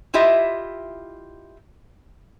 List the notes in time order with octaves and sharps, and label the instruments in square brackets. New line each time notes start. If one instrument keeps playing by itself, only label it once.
[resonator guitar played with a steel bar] E4 F4 G4 D#5 E5